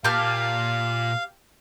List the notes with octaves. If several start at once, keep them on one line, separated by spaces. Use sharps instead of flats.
A#2 G4 F5 A5 F6